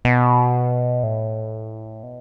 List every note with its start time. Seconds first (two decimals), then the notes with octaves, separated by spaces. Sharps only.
0.05 B2
1.03 A2
2.03 B2